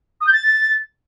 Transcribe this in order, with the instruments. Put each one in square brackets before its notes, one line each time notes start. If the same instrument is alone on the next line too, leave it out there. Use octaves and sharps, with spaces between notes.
[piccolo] D#6
G6
A6